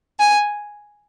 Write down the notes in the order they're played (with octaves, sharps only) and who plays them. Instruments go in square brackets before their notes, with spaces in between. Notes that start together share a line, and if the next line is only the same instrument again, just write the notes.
[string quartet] G#5